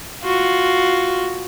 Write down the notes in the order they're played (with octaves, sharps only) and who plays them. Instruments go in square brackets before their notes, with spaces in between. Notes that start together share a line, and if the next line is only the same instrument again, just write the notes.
[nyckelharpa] F4 F#4